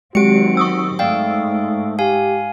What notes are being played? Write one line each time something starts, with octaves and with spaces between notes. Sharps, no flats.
D#3 F#3 G#3 C4 F#4 G4 C#7 D7
C#6 D#6 E6
G#2 A3 D5 F5 G5
G4 F5 G#5